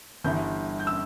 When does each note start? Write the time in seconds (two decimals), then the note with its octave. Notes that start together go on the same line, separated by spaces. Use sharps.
0.24 G1 G2 E3 G6
0.80 G6
0.87 E6